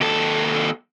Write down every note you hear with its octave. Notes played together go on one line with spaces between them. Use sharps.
D#2 A4